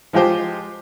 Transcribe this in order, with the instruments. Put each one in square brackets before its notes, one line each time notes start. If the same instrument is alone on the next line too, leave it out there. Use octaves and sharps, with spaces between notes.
[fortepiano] F3 G#3 F4 G4 C5